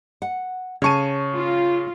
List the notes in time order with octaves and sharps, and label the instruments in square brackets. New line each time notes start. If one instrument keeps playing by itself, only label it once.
[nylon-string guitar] F#5
[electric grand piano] C#3 C#6 D#7 [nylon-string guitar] C#5 A5
[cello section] F4